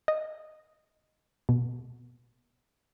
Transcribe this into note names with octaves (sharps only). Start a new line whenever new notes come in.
D#5
B2